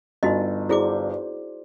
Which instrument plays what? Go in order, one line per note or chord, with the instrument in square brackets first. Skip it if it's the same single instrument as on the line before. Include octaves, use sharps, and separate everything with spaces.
[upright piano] G1 [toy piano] D#4 F#4 D#5
[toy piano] E4 G#4 D6 [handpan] F#4 C5 D5